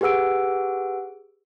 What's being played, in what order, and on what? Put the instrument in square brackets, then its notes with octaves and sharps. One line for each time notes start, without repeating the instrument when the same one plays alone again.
[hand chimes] G4 G#4 B4 F#5 E6 D7